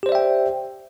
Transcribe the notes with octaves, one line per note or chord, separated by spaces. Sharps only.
G4 C5 D5 E5 G5